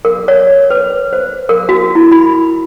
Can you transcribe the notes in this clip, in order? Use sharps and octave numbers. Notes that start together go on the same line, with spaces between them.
A#4
C#5
B4
C5
A#4
F#4
E4
B5